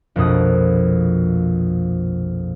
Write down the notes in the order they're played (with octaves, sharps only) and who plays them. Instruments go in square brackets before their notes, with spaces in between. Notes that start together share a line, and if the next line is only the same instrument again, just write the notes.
[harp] A#1 F2 B2 D#6